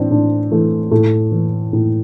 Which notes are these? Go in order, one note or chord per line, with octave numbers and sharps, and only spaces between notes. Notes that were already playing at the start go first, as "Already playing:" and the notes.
Already playing: A2 E3 C4 D4
A2 D4
E3 A3
A2 A3
E3
A2